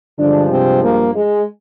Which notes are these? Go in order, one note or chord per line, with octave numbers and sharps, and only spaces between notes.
G2 D3 F3 G#3 D4
C3 C4
A#3
G#3